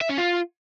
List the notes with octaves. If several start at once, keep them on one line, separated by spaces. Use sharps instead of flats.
E5
C#4
F4